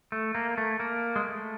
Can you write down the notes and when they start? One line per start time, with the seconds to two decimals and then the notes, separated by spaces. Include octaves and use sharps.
0.12 A3
0.35 A#3
0.58 A3
0.80 A#3
1.16 G#3
1.25 A3